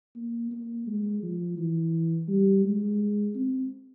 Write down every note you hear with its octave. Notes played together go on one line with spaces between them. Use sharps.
A#3
A#3
G#3
F3
E3
G3
G#3
C4